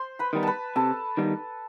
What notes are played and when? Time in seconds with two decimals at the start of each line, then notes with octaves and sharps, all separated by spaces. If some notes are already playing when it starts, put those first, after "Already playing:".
Already playing: C5 C6
0.19 B4 B5
0.33 D#3 G3 B3 D#4
0.43 B4 A5 B5
0.76 C3 A4 A5
1.17 D#3 G3 B3 D#4